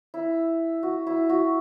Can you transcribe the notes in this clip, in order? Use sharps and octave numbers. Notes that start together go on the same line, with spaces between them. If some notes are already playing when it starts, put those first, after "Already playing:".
E4
F#4
E4
F#4